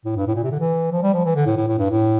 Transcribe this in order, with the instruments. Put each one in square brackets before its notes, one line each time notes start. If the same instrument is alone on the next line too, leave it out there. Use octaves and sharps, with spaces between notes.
[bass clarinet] A2
G2
A2
A#2
C3
D3
E3
F3
G3
F3
E3
D3
A2
A2
A2
G2
A2